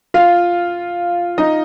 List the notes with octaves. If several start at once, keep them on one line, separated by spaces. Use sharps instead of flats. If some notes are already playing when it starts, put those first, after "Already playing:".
F4 F5
D#4 D#5